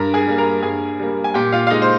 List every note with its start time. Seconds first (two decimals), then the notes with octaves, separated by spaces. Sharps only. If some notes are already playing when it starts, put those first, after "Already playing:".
Already playing: G2 A#4 A#5
0.14 G#4 G#5
0.27 G3 A#3
0.38 A#4 A#5
0.62 G2 G#4 G#5
0.99 G3 A#3
1.24 G#5
1.34 A#2 G4 G5
1.52 F4 F5
1.67 F5
1.70 G#3 D#4 D#5
1.82 C5